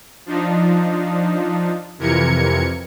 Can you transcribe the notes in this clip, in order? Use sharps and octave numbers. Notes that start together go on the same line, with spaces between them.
F3 D4 D#4
F2 C3 E3 A#4 G#6 C#7